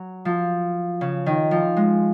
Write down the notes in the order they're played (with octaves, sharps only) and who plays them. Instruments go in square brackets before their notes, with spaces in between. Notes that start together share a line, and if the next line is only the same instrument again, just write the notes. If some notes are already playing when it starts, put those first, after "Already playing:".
Already playing: [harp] F#3
F3
C#3
D#3
F3
G#3